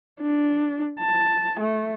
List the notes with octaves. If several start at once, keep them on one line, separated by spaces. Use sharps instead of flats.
D4
A5
A3